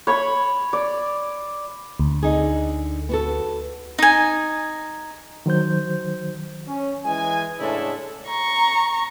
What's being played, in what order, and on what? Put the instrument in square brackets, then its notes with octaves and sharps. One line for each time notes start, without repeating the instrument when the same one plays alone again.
[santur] C#5 B5 C#6
D5
[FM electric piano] D2
[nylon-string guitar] D3 D#4 G#4
B3 F#4 A4
[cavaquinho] D#4 G#5
[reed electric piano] D#3 F#3 C5 G6
[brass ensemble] C#4
E3 G#3 D#5 G#5
A2 C#3 G#3 D4 E4 A4
[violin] A#5 C#6